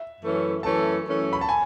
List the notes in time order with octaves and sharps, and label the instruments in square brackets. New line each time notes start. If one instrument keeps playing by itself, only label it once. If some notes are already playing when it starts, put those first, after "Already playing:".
Already playing: [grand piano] E5
[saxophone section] F#2 E3 A3 C#4
[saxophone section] F#2 E3 A3 C#4 [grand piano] A5
[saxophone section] F#2 E3 A3 C#4
[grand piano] B5
A5
G#5